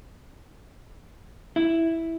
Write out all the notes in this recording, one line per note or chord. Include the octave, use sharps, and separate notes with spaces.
E4